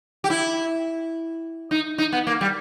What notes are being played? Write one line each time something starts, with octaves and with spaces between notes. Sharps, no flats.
G4
E4
D#4
D#4
B3
A#3
G3